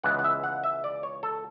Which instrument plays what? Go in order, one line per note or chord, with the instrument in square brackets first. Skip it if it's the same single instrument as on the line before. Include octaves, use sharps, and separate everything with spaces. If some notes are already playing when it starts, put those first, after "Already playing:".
[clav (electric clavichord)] C#2 C#3 E3 G#3 B3 F#5
F#5
E5
F#5
E5
D5
C#5
A4